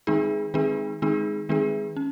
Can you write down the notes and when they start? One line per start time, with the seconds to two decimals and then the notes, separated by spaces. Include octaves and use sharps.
0.07 D#3 G#3 C4 D#4 G#4
0.54 D#3 G#3 C4 D#4 G#4
1.02 D#3 G#3 C4 D#4 G#4
1.49 D#3 G#3 C4 D#4 G#4
1.96 C#4